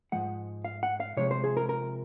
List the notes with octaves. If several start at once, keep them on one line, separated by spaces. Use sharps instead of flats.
G#2 F3 G#3 F#5
F5
F#5
F5
C3 F3 G#3 C#5
C5
G#4
A#4
A#4